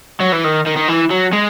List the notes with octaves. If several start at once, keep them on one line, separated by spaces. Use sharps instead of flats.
F#3
E3
D#3
D#3
D#3
E3
F#3
G#3